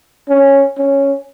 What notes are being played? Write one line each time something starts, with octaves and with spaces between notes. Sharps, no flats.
C#4
C#4